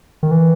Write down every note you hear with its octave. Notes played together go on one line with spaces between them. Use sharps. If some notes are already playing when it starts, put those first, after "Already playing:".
D#3
E3